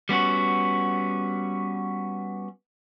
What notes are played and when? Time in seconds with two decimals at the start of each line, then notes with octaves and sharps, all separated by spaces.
0.09 G3 B3 C#4 F#4